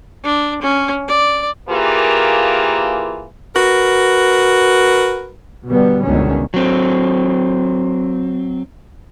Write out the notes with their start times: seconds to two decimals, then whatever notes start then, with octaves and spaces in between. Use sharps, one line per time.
0.24 D4
0.62 C#4
1.08 D5
1.69 E3 A#3 F4 G4 G#4 A#4
3.54 F#4 A#4 B4
5.67 B2 D3 G3 B3
6.05 G1 C#2 B2 D3 D#3 C#4
6.54 F#3 C4